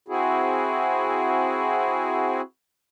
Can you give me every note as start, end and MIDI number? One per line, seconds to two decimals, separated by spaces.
0.08 2.41 60
0.08 2.41 64
0.08 2.41 66
0.08 2.41 68